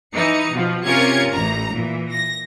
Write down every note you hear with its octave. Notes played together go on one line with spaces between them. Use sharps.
E3 D#4 C#7
B2 F3
C3 C#4 F4 A#4 G#6 C#7
A1 A#5
A#2 E3
A#6